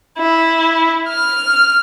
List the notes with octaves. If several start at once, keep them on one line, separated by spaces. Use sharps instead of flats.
E4
F6